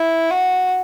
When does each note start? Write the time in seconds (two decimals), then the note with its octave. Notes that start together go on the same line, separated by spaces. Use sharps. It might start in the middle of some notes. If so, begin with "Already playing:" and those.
Already playing: E4
0.30 F#4